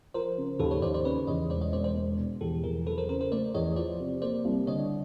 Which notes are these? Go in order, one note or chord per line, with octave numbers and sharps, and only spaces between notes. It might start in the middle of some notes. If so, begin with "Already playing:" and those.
F3 A#4 C5
C#3
D#2 A4 B4
B4 C#5
D#2 C5 D5
C5 D5
C#3 B4 C#5
E2 C#5 D#5
E1 C5 D5
C#5 D#5
E1 C5 D5
C5 D5
G#3
B2
E2 G4 A4
E2 G#4 A#4
F#3 A4 B4
A#4 C5
C#3 A#4 C5
A#4 C5
A3 C5 D5
E2 C#5 D#5
F3 C5 D5
C3
A#3 C5 D5
C2
D3 C#5 D#5